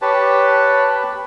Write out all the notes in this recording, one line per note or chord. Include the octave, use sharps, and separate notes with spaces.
G4 B4 C#5 A5